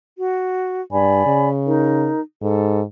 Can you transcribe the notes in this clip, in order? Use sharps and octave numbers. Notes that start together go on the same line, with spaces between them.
F#4
G2 D5 G#5 B5
C#3
D#4 A#4
G#2 A4